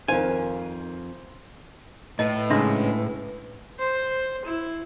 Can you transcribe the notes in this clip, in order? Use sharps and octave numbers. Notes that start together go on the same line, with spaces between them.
F2 D#3 A#4 C5 F5 G#5
A2 B4 D#5 A5
G#2 C#3 G#3 D4 E5 C6
C5
E4